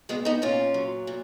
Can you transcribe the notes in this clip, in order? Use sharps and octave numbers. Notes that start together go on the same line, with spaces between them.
A#2 G#3 B3
B3 D#4
A#2 C#4 F4
F#3
A#2